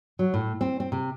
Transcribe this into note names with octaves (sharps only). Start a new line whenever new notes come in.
F#3
A2
C4
C4
C3